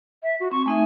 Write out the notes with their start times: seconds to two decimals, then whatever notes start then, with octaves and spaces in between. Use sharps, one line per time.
0.23 E5
0.40 F#4
0.52 C4 C#6
0.66 A3 D#4 E5 G#5